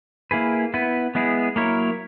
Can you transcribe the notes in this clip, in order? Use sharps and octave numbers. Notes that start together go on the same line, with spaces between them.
A#3 E4 G#4 B4
B3 E4 B4
G#3 B3 E4 G#4
F#3 A#3 E4 A#4 C#5